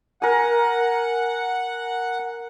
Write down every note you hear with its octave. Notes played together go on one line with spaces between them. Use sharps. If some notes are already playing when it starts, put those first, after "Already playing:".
A#4 F#5 G#5